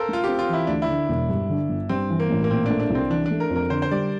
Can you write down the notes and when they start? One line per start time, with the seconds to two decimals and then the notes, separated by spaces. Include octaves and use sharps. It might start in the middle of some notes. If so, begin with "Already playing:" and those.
Already playing: A4 A#4 C5 F5
0.09 A3 F4
0.24 C4 G4
0.39 F4
0.49 E3 E4
0.67 D2 D4
0.82 E4
0.89 D3
1.09 E1
1.30 G2
1.50 D3
1.69 G1
1.89 G2 C4
2.10 E3
2.20 A#3
2.30 A1
2.44 A#3
2.50 A#2 C4
2.66 A3 D4
2.80 D4
2.90 C2
2.95 C4
3.10 E3 D4
3.26 D4
3.31 A3
3.40 A#4
3.50 F2
3.56 A#4
3.70 D3 C5
3.82 C5
3.91 G3 D5